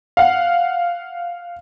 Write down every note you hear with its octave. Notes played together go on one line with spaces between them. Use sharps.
F5 F#5